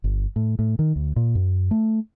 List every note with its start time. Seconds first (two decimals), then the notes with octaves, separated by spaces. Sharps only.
0.04 G1
0.36 A2
0.59 A2
0.79 D#3
0.96 D2
1.16 A#2
1.35 F#2
1.71 A3